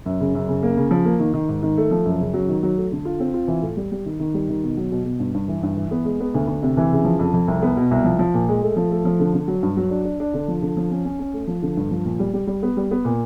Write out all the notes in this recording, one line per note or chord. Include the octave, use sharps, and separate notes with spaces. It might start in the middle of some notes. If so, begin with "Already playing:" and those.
F#2
C#3
F#2
C#3
A#3
C#3
F3
A#3
D#3
D#3
G#2
D#3
A3
F3
F#2
C#3
F#3
D#3
F#3
A3
D3
F4
C4
F4
E3
A2
G3
G3
D#3
D#3
G3
D#3
B2
F#3
B2
B2
G2
G2
E3
G2
E3
B3
G#3
B3
D2
D2
C3
E3
C#3
F3
F2
F2
C2
B3
B2
C2
F3
F3
A#2
G#3
A3
F3
A3
F3
D3
D3
F#3
G2
F#3
D4
D4
D4
D3
F3
D3
F3
C#4
C#4
C#4
A3
F3
D3
G2
F3
A#2
G3
G3
G3
B3
G3
B3
A#2